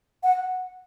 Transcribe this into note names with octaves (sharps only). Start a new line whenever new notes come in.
F#5